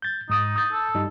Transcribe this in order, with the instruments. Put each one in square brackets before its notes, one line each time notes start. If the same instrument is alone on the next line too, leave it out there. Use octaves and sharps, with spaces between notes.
[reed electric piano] G6 A6
[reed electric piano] G#2 D#6 A6 [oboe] D#4
[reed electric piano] D#6 G6 A6
[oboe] A4
[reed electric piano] G2 G3 D#4